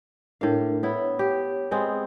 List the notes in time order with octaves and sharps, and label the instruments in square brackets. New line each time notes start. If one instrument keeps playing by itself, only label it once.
[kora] A2 F5 [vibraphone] D4 A#4
[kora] B3 E4 [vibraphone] C#5
[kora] G4
G#3 B3 C4